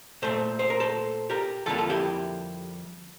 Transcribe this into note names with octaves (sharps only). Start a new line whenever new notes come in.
A#2 A3 A4 C5
C5
A#4
A4 C5
G4 A#4
F2 D3 G3 A#3 F4 A4
F4 A4
E4 G4